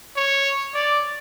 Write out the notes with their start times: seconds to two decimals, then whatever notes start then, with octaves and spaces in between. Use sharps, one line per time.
0.17 C#5
0.74 D5